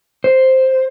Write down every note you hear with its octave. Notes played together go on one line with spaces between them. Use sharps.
C5